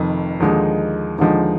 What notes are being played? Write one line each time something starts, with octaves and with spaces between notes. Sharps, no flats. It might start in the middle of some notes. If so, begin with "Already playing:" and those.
Already playing: F1 F2 D#3
D#2 D3 F3 G#3 D#4
D#2 D3 F3 G#3 D#4